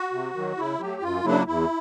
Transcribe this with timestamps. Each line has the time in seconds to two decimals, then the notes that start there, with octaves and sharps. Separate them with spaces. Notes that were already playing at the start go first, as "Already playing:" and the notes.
Already playing: F#4
0.13 C3
0.34 D#3 F#3
0.57 C#3 E4
0.80 F#3 A3 G4
1.02 F#2 F4
1.24 C#3 F#3 A#3 D4 E4
1.47 E2 E4